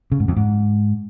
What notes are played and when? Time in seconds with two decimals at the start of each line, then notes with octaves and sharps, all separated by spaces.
0.12 C#3
0.20 G#2
0.28 F2
0.36 G#2